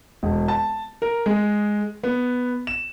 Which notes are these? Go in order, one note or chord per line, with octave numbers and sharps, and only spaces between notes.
E1
A5
A#4
G#3
B3
E7